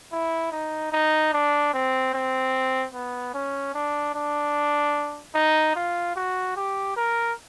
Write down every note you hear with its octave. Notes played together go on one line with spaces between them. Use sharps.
E4
D#4
D#4
D4
C4
C4
B3
C#4
D4
D4
D#4
F4
F#4
G4
A#4